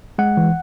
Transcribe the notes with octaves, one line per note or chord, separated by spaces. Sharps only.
G#3 F#5
E3